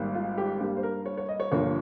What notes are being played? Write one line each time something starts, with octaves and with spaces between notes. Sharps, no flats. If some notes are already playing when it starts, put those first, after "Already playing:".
Already playing: G#1 G#2 G3 A#3
F4
G4
G2 G3 A#3 G4
C5
A#4
C#5
C#5
D#5
C#5
G1 G2 F3 A#3 C#5